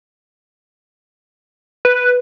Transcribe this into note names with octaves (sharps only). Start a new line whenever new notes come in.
B4